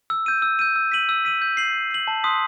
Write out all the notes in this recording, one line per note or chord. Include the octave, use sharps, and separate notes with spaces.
E6
G6 D#7
E6
G6 D#7
E6
B6 D#7 F#7
E6
B6 D#7 F#7
G6
C7 F#7
G6
C7 F#7
A5
C6 D#6 F#6 B6